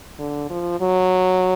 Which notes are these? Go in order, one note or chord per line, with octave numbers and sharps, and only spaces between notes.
D3
F3
F#3